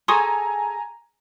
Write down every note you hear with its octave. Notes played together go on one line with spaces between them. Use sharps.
G#4 A4 G#5 A#5 C6 C#6 D#6